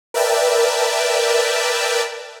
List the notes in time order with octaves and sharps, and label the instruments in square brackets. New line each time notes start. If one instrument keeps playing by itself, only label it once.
[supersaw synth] A#4 B4 D5 E5 G5 A5